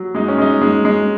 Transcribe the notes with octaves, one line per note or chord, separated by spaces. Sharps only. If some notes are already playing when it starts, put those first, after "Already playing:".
Already playing: F#3
G#3 D#4
C#4
G#3 D#4
G#3
G#3